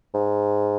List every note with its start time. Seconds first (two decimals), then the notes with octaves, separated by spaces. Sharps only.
0.14 G#2